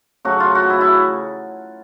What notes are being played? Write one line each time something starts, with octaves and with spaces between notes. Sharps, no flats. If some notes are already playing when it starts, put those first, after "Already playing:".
C#3 F#3 A3 F#4
F4
F#4
E4
E4